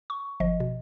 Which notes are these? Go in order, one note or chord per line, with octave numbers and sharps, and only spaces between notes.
C#6
G1 F3 D#5
B2